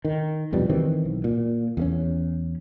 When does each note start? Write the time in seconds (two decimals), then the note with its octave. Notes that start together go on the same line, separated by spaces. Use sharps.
0.05 D#3
0.52 C2 F2 B2 G3
0.70 D#3 E3 C4
1.05 B1
1.24 A#2
1.77 E2 A3 C#4